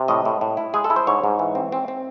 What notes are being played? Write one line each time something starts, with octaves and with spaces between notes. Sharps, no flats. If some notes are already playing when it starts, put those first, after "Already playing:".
Already playing: C3
A2 D#5
A2
A2
E4
G#3 G#4
A4
E4
C5
G#2 C#5
G#2
E3
C4
C4
C4